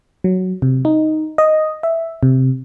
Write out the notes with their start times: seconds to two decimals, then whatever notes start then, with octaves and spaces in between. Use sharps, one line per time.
0.24 F#3
0.62 C3
0.85 D#4
1.38 D#5
1.83 E5
2.23 C3